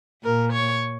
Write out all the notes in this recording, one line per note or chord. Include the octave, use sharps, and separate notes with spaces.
A#2 A#4
C#5